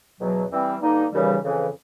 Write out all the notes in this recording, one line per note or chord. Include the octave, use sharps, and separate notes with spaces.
E2 B2 F#3
E3 G3 C4
G2 D3 G3 A#3 D#4
D#2 C#3 E3 G3
F2 C#3 E3